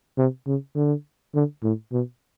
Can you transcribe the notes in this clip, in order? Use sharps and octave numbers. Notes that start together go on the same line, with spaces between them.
C3
C#3
D3
D3
A2
B2